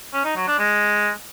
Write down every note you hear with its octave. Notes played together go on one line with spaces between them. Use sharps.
C#4
D#4
F#3
D4
G#3